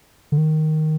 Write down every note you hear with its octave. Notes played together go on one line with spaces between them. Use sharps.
D3
D#3